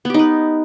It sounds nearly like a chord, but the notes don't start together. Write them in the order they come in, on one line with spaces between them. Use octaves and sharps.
B3 G4 D#4 B4